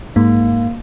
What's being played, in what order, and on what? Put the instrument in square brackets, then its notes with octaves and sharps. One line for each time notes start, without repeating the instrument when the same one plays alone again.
[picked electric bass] G#2 [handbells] A#3